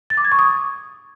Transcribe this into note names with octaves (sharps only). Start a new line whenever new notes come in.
A6
D6
G#6
C#6
D#6